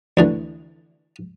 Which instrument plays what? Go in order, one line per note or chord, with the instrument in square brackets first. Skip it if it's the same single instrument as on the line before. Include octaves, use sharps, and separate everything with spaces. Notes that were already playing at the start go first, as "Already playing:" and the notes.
[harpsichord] D2 D3 E3